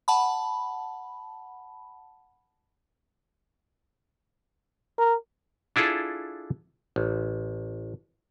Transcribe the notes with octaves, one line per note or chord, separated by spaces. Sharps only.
F#5 A5 B5
A#4
D4 E4 F4 G#4 A4
A1